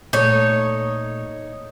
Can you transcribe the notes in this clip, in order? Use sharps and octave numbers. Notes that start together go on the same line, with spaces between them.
A#2 A3 D#4 A4 C#5